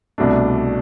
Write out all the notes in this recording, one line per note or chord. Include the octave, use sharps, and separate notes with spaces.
C2 B2 A3 D4